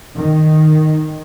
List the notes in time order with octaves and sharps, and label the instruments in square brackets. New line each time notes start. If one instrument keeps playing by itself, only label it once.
[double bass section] D#3